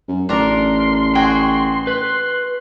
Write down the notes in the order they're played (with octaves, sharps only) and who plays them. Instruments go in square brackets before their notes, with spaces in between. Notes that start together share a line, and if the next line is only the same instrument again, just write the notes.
[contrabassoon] F#2
[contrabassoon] A1 [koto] D4 A#4 [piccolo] C6
[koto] F#4 G#4 [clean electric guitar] G5
[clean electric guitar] B4 [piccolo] C6